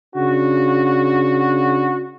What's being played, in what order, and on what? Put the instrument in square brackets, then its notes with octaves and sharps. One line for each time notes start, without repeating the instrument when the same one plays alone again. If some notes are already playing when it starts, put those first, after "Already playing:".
[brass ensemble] C#3 D4 F#4